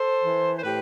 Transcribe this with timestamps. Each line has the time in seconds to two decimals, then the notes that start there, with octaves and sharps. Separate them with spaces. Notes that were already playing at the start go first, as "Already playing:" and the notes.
Already playing: A4 C5
0.24 E3
0.56 C5
0.63 A2 G4 B4